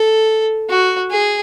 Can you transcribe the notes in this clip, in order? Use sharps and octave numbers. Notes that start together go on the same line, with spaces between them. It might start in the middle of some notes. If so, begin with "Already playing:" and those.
Already playing: A4
F#4
G#4